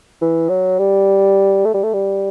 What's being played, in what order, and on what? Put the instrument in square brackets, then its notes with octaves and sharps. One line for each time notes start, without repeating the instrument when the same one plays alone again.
[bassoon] E3
F#3
G3
A3
G3
A3
G3